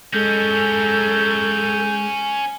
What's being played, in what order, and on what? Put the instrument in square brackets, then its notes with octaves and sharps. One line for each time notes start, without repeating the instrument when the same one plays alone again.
[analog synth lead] G#3 [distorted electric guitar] C#4 A#4 [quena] A4 [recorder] G6